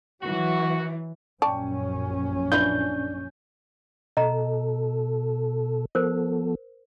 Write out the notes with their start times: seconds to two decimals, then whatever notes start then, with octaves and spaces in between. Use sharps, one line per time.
0.22 E3 F#3 F#4
1.42 A#1 F#2 C#4 D5 G5 A5 C#6
2.52 D4 E4 F4 B4 G6 G7
4.17 B2 A4 D#5 A#5
5.95 F3 B3 A4 A#4 C5